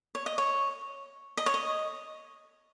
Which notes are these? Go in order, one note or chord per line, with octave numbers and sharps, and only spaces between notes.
C#5
D#5
C#5
D#5
C#5
D#5